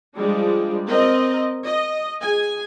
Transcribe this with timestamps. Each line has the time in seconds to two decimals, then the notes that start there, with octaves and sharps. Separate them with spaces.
0.16 F3 G3 G#3 D4
0.87 C4 A#4 D#5
1.63 D#5
2.21 G#4 G#5